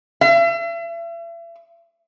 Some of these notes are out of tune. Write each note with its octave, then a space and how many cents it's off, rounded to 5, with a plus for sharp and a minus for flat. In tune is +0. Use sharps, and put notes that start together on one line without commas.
E5 +40